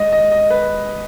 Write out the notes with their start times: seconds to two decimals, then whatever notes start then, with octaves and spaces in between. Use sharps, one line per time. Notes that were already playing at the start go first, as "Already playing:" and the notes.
Already playing: G#3 D#5
0.12 D#5
0.32 D#5
0.50 B4